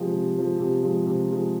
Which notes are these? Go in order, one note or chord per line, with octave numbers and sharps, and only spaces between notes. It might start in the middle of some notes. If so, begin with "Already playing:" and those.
Already playing: C3 F3 G#3
C3
F3 G#3
C3
F3 G#3
C3
F3 G#3